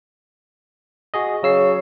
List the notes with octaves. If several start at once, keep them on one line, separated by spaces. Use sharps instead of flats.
F#4 G#4 D#5
C#3 F#3 E6 C7